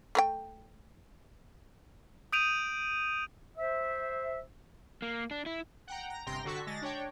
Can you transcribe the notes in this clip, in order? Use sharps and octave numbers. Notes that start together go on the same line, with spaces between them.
A3 A#4 G5
D#6 G6 D7 D#7 F7
C5 E5
A#3
D4
E4
F#5 G5 A#5
A#5
G1 C3 G5 A#5 C6 A#6
D3 F#4 A4 C#6 B6
D3 G#3 A6 A#6
D4 C#5 G5